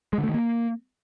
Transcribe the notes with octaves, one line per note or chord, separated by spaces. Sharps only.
G#3
D3
A3
D#3
A#3